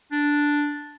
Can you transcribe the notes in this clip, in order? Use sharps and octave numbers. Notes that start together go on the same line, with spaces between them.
D4